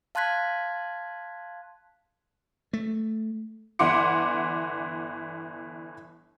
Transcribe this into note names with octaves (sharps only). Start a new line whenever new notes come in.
F5 A5 C6 F#6 G#6 B6
A3
G1 E3 F#5 C6 D6 C#7